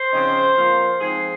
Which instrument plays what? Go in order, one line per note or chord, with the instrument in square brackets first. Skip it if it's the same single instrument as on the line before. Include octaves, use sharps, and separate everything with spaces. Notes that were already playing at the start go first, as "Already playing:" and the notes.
Already playing: [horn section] C5
C#3 F3 C4 D#4
F3 A#3 F4
G#2 F3 C4 G#4